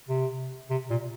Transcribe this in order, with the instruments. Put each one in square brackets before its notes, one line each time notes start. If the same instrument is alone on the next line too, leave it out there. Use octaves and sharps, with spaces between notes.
[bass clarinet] C3
C3
A#2